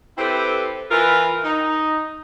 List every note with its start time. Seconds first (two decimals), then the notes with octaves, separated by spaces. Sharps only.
0.18 C4 E4 G4 A4 B4 C5
0.90 E3 F4 A#4 B4
1.44 D#4